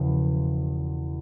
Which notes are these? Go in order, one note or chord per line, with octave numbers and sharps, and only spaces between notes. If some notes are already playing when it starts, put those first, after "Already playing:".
Already playing: E1 E2 C#3 F3